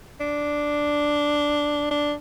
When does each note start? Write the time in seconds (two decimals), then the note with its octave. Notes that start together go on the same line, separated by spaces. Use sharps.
0.20 D4
1.91 D4